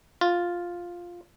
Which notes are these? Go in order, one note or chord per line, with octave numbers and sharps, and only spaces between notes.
F4